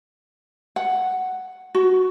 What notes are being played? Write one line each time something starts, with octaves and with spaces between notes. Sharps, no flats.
F#5
F#4